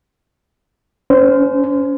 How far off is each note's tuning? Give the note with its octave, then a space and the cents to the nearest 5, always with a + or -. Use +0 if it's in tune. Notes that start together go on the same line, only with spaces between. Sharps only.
C#4 +25 C5 -25